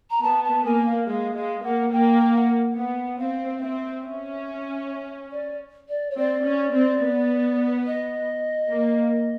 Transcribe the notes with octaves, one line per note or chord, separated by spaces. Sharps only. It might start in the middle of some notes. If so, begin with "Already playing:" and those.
A#5
B3 A5
A5
A#3 G#5
F5
G#3 F5
G#3 F5
A#3 F#5
A#3 G5
F#5
B3 F#5
C4 F5
F5
C4 E5
C#4
D5
D5
C#5
C4 D5
C#4
C4
B3
D#5
A#3